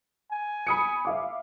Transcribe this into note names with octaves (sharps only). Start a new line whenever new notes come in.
G#5
B5 D#6 C#7
E5 F5 D6